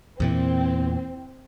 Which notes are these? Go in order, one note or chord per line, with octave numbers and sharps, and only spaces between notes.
E2 A#2 E3 C4